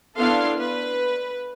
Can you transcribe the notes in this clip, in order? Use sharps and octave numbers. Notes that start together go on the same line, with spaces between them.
B3 D4 E4 A4 F5 C6
B4